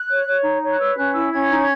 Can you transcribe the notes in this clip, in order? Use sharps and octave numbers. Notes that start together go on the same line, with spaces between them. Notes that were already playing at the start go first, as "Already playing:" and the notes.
Already playing: F#6
C#5
C#5
D#4
C#5
F#6
B4 E6
C#4 F#6
E4 E6
C#4 G#6
D#4